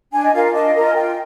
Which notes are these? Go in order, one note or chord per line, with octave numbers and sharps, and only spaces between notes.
D4 G#5
D#5
F4 A#4 F5
D4 D#5
F4 A#4
G#5
F4 G5